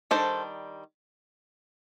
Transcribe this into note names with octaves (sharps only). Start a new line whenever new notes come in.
D#3 G3 D4 A4 C5